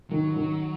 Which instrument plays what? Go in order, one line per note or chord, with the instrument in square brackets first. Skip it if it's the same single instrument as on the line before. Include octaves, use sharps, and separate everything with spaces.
[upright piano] D#3 [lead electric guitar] F#3
[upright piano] D#3